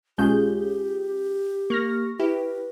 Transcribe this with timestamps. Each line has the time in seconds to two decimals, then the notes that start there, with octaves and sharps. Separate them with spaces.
0.18 B1 G#3 C#4 F4 G4 G#4 G6
1.70 A#3 C#6 F6 A#6
2.20 E4 G4 B4